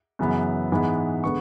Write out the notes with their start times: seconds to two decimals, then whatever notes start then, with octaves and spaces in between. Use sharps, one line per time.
0.19 F#2 C#3 E3 B3
0.72 G#2 E3 G#3 B3
1.24 D3 G#3 B3 C#6